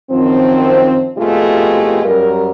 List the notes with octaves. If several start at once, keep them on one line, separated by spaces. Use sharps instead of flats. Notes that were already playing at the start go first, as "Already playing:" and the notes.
F#2 D#3 F3 C4
F2 B2 G#3 A3 F4 G4
F#2 G3 A#4